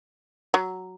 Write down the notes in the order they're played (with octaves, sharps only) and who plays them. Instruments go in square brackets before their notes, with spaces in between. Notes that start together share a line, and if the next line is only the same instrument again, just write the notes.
[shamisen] F#3